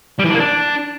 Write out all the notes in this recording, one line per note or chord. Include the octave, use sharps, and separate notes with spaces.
G3
E3
D4
A#3
D4